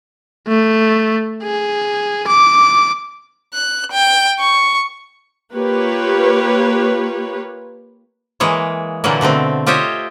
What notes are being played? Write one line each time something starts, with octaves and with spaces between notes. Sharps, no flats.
A3
G#4
D6
F#6
G5
C#6
A#3 F4 G4 B4 C#5
E3 G#3 A#3 C#5
A#2 D3 E3 F#3 A#3
B2 D3 A3 C4
F4 G4 C5 C#5 D#5 E5